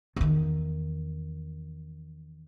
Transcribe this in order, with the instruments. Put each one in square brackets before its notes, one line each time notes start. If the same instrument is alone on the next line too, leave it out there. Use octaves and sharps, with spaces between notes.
[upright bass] E2 D#3